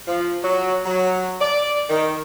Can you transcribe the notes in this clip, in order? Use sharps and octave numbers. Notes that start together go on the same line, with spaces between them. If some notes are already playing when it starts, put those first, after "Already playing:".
F3
F#3
F#3
D5
D#3